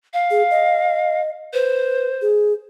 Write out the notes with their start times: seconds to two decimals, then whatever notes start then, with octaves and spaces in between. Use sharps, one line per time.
0.13 F5
0.31 G#4
0.51 D#5
1.53 B4 C5
2.22 G#4